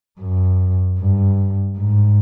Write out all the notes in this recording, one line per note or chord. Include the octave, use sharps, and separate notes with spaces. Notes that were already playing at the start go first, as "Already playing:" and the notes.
F#2
G2
G#2